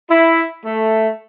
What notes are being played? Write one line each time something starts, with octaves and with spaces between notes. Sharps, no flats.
E4
A3